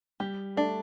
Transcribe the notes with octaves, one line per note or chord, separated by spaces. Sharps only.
G3 G4
A3 D4